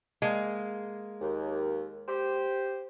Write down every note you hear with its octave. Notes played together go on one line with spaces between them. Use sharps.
G#3 A#3
D#2
G4 C5